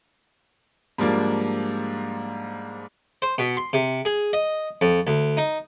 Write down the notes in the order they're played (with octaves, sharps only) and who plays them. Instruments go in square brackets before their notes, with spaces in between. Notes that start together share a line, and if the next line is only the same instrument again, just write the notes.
[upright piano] G#2 F3 G3 A#3 D4
[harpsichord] C5
B2
C6
C3
G#4
D#5
F2
D2
D#4